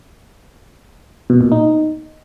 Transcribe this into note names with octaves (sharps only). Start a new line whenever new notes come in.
B2
A#2
D#4